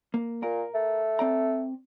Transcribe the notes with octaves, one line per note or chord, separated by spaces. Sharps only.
A#3
A#2 A#4
A3
C4 D5 A#5